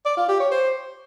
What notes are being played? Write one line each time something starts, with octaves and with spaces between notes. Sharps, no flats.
D5
F4
G4
C#5
C5